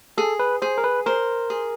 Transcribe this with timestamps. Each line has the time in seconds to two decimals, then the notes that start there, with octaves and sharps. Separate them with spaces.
0.18 G#4 A4
0.39 B4
0.62 G#4 C5
0.78 A#4
0.84 B4
1.06 A#4 C5
1.50 G#4